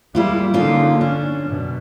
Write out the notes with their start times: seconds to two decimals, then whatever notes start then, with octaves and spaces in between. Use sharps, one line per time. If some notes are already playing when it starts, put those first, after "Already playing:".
0.15 G3 G#3 A#3 E4 F4
0.54 D3 A#3 C#4 D#4 F4
1.01 C#4 D4
1.46 F#2 B2